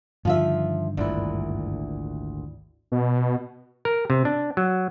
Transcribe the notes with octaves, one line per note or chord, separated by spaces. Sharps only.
G2 D3 D#3 F3 F4 E5
G#1 D2 A#2 D4 E4
B2
A#4
C3
D4
F#3